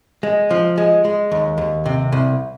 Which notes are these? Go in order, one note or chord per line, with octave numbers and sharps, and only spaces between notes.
G#3
F3
G#3
G#3
D#2
D#2
C3
C2